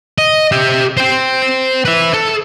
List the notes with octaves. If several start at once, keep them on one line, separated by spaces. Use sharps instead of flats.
D#5
G4 E5
C5 G5
B4 E5
A4